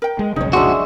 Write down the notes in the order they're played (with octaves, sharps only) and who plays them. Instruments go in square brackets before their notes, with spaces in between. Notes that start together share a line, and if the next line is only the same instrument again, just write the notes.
[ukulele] A#4 G5
[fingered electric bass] G#3
[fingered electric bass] F1 B1 C#3 [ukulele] D#4 C#5
[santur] G#3 D4 E5 [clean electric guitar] F#4